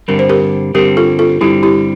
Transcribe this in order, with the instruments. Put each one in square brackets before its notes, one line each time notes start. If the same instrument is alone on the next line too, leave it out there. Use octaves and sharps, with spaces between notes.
[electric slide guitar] G2 D3 G3 C4 [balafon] A#4
[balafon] C5
G4 A#4
[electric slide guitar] G2 D3 G3 C4 [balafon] G4 A#4
[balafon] F4 A4
F4 A4
[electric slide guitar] G2 D3 G3 C4 [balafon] E4 G4
[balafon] E4 G4